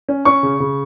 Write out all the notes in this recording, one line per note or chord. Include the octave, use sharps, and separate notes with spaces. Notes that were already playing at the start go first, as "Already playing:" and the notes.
C#4
C#4 C#6
C#3
C#3